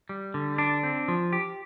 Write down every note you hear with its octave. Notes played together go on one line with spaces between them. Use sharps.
G3
D3
D4
C4
F3
G4